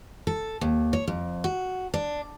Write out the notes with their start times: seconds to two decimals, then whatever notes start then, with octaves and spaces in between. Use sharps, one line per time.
0.27 A4
0.61 D#2
0.93 C#5
1.08 F2
1.44 F#4
1.94 D4